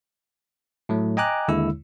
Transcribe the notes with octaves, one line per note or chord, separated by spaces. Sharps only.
A2 F#3 A3
D#5 G5 G#5 A#5 D6 F#6
D#2 D3 G#3 E4 E6